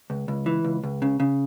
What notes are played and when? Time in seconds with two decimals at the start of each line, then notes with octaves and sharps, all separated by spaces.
0.10 C#2
0.28 C#2
0.46 E3
0.64 C#2
0.84 C#2
1.02 C#3
1.20 C#3